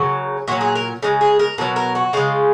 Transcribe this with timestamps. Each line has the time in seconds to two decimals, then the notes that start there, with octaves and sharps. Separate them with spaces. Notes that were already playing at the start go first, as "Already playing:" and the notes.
Already playing: C#3 F#3 A#4
0.48 A#2 F#3 F#4
0.61 G#4
0.75 A#4
1.03 C#3 G#3
1.21 G#4
1.39 A#4
1.58 B2 F#3 A#4
1.76 A#4
1.95 F#4
2.13 C#3 G#3 F4